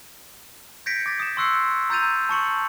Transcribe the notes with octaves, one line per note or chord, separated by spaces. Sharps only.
G6 G#6 A#6 B6 C#7 D7
D6 A6 B6
D#6 E7
C6 C#6 E6 F#6 C7 C#7
A#5 E6 G6 A6 D#7 F7
A5 C#6 C#7 F#7